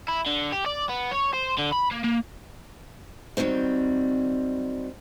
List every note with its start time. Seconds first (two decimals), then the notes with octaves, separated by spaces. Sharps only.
0.08 E4
0.26 D3
0.52 G4
0.66 D5
0.89 B3
1.11 C#5
1.33 C5
1.58 D3
1.72 B5
1.91 A#3
2.04 A#3
3.37 D#3 F#3 G3 C4